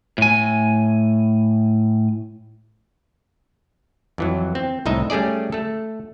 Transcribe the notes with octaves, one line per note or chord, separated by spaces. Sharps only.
A2 G#5
F2 E3 F#3
C4
C2 A2 D#4 D#5 E5
G3 A3 C#4 G#4 D5
A3 A4